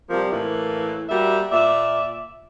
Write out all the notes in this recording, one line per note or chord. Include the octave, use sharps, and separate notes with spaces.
C3 F3 G3 A#3
A2 E3 A#3
G3 A#3 F#4 E5
A#2 D5 E5